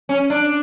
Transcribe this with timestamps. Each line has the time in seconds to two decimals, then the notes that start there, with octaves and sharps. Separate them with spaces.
0.09 C#4
0.30 D4